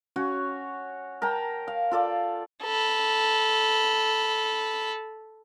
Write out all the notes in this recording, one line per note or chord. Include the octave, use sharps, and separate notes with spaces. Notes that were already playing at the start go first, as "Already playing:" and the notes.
C#4 F#4 C#5
A#4 G5 A5 A#5
F5
F4 A4 D5
A4 B5